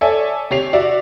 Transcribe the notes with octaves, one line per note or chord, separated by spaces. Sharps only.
A4 C#5 D5 E5 G#5
C3 G4 C#5 C7 F7
F#4 D5 E5